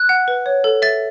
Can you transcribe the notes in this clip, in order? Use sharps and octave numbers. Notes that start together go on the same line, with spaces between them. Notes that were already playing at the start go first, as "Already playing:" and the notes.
Already playing: F#6
F#5
B4
C#5
A4
E5 A6